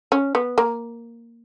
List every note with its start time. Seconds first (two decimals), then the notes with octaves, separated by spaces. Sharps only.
0.12 C#4
0.35 B3
0.58 A#3